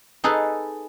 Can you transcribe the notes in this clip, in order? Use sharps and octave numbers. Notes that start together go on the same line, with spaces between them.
D#4 G#4 A4 B4